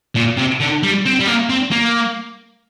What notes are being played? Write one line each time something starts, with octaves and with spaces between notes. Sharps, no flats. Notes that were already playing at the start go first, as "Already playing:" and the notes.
A#2
C3
D3
G3
C4
G3
A#3
C4
A#3